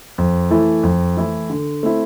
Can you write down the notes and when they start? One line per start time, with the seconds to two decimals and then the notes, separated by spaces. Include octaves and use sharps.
0.18 F2
0.51 E3 A3 E4
0.83 F2
1.17 E3 A3 E4
1.50 D3
1.83 A3 C4 E4